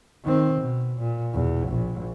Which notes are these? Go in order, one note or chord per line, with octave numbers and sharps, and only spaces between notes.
D#3 C4
B2
A#2
E2 B2
A#1